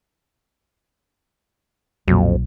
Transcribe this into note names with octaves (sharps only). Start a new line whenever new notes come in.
B1 F2 A#2 F#3